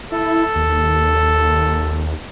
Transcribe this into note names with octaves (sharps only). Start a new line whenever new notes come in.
E4 A4
D#2